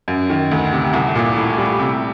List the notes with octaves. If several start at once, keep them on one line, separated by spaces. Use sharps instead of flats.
F#2
D#3
D2
C3
C2
A#2
A2
G3
C3